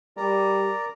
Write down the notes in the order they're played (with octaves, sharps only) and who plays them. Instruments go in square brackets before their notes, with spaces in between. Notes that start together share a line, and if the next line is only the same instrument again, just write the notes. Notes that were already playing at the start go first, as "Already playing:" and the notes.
[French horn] G3 [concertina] A#4 D5 A#5